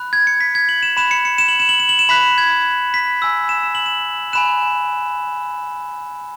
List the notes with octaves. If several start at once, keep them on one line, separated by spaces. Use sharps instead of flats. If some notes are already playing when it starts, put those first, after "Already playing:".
Already playing: B5 F#6
G#6
C#7
B6
G#6
F#7
E7
B5 F#6 E7
C#7
C#7
E7
F#7
E7
F#7
E7
F#7
E7
B5 F#6 B6
G#6
B6
G#5 E6
E7
E7
F#7
E7
G#5 B5 F#6 E7